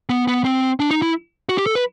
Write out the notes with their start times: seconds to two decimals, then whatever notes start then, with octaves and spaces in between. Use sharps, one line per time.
0.09 B3
0.28 B3
0.45 C4
0.80 D4
0.91 D#4
1.02 E4
1.49 F#4
1.58 G4
1.66 A4
1.75 B4